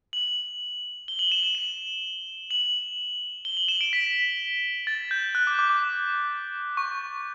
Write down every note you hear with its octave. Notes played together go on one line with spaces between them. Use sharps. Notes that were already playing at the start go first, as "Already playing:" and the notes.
F#7
G7
F#7
E7
F#7
E7
F#7
G7
F#7
E7
D7
B6
A6
G6
F#6
D6
D6
D6
C#6